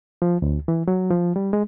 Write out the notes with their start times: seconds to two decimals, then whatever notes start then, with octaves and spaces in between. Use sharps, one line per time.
0.22 F3
0.42 D2
0.68 E3
0.88 F#3
1.11 F3
1.36 G3
1.53 G#3